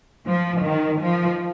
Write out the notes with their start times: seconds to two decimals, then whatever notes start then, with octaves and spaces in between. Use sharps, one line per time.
0.25 F3
0.63 D#3
1.01 F3